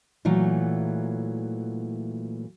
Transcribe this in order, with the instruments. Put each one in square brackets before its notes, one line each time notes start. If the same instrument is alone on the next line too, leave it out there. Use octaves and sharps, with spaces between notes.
[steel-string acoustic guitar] A#2 E3 F#3 A3